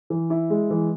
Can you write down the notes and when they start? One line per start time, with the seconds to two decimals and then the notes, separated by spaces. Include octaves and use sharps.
0.10 E3
0.30 E4
0.50 G#3
0.70 E3